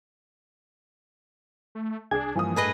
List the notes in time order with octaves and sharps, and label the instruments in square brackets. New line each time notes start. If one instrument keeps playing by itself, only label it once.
[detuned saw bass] A3
[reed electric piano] C2 G#6 [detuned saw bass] D4 [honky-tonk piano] G#4
[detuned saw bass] G2 [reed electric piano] E3 F3 A#3 [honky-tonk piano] G#5 D#6
[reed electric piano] A2 A3 A4 [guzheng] G#4 B4 D#5